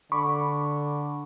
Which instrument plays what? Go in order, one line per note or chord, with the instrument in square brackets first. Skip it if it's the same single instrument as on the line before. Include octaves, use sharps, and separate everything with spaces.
[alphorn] D3 [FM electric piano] B5 C#6 D6